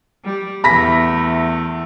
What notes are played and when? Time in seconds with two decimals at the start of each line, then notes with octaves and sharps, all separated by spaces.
0.25 G3
0.64 E2 A3 B5 A#6 B6